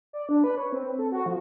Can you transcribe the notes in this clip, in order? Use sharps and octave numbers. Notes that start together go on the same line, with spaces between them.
D5
D4
B4
C#5
C4
A4
F#4
F3